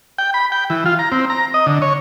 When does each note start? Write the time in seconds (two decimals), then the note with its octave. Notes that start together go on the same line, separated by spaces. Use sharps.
0.18 G5
0.34 B5
0.52 G5
0.70 E3
0.86 F4
0.99 A#5
1.12 C4
1.30 A#5
1.54 D#5
1.66 D3
1.82 C#5